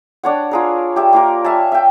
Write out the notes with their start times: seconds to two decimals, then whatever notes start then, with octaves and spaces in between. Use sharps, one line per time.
0.23 D4 C#5 F#5
0.51 F4 G#4 A#4
0.96 G4 E5
1.13 A#3 F4 A#4
1.44 E5 F5 G#5 A5
1.72 E5 G5